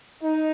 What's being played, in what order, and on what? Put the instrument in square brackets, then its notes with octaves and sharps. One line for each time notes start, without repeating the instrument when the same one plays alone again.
[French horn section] D#4